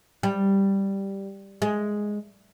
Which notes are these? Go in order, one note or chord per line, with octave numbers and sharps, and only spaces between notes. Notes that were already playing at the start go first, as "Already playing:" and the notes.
G3
G#3